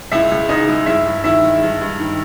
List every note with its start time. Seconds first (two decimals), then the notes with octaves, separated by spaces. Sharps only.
0.12 C#2 E4 E5
0.31 C#2
0.49 C#3 D#4 D#5
0.69 G#3
0.86 G2 E4 E5
1.06 G2
1.24 D#3 E4 E5
1.44 G#3
1.62 G2
1.81 G2
2.00 D#3